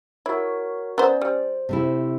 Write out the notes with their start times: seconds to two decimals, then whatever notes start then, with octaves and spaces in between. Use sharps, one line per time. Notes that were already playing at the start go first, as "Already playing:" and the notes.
0.26 E4 F#4 A#4 C#5
0.98 B3 C#4 A#4 C5 D5
1.21 G3 C5
1.69 C3 A3 E4